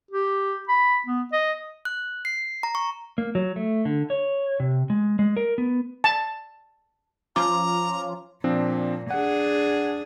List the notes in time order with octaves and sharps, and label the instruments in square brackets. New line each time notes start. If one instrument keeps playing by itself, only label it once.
[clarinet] G4
B5
B3
D#5
[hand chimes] F#6
C7
A#5
C#6
[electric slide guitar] A#3
F#3
A3
D3
C#5
C3
G#3
G#3
A#4
B3
[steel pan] A5
[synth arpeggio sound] F3 C#4 F4 [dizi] A#5 [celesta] D6
[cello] A#2 [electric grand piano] F3 C4 D4
[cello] D4 G#4 [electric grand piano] F#5